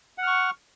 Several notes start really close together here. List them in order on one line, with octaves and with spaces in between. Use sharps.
F#5 F6 C#6